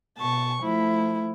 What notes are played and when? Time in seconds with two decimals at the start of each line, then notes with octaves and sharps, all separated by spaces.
0.18 B2 A5 C#6
0.62 F3 A3 E4